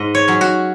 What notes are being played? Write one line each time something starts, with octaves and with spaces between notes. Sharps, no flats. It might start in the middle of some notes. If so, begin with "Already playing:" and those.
Already playing: G#2 D#5
C#5
F#3 C#4
F#4